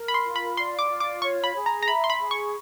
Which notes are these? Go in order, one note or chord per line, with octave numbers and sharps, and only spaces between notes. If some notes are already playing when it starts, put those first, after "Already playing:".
Already playing: A#4
B5
C6
F4
B5
D5 C6
D6
F4
D6
C#5 C#6
B5
G#4
A#5
A#5
E5 B5
C6
B5
G#4
C#6